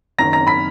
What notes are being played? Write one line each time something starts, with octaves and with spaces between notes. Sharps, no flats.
F#1 F#2 D#3 A#5 A#6
A#5 A#6
B5 B6